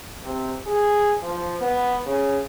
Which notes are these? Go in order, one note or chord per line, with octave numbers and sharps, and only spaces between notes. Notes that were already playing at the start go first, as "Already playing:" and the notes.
C3
G#4
F3
B3
C#3